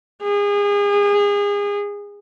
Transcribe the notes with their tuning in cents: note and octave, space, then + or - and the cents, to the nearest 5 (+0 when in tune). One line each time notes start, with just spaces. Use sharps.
G#4 -30